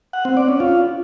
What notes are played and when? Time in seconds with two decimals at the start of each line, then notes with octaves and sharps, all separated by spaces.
0.13 F#5
0.25 C4
0.37 D5
0.48 C#4
0.60 F4